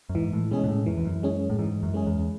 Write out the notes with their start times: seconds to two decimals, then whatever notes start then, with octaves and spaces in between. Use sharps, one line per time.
0.09 F#2
0.15 G#2 E3
0.33 A2
0.51 B2 G#3 C#4 G#4
0.64 B2
0.68 A2
0.86 F#2 E3
0.97 E2
1.06 F#2
1.23 G#3 C#4 G#4
1.50 A2
1.59 G#2 E3
1.83 F#2
1.94 G#3 C#4 G#4
2.06 E2